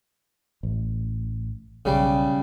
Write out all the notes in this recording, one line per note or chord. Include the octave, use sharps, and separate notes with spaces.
A1
B1 C#3 G3